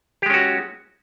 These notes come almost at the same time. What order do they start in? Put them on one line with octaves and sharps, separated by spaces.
G4 G#3 C#4 F#4